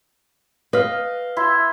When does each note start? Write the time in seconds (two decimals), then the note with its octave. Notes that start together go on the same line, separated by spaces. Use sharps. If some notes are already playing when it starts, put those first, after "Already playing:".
0.73 B4 D#5 F5
1.37 E4 E5 C6